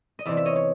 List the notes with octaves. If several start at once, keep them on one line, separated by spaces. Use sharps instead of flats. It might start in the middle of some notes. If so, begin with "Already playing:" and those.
D#5
E2 C3 E3 D5 E5
E5
C#5 D#5
C#5